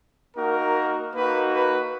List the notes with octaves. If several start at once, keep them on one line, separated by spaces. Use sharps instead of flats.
A#3 D#4 F#4 A#4
A#3 D#4 F#4 B4
B4